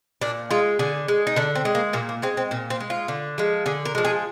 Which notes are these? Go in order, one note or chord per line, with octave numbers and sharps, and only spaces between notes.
A#2 D4
G#3 F4
D3 G#4
G#3
D#4
D3 D4
C4
G#3
A#3
A#2 A#3
A#3
G#3 C4
C4
A#2 C4
C4
G#3
F4
D3
F3 G#3
D3 G#4
A#4
F3 G#3
G#4